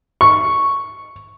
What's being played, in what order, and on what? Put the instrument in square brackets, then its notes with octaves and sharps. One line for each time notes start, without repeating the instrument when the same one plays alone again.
[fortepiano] C#6